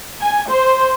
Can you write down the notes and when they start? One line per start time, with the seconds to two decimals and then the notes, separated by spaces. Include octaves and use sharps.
0.21 G#5
0.50 C5